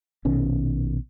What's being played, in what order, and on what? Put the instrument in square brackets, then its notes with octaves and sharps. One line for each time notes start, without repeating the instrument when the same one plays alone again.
[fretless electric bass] A#1 B2 D#3 C#4